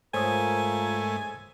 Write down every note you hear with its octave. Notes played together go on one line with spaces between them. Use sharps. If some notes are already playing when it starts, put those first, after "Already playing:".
G#2 A3 F4 A#4 C5 C#5 G#5 D#6